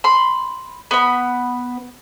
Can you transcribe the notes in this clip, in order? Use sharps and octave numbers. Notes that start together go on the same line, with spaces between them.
B5 C6
B3 B5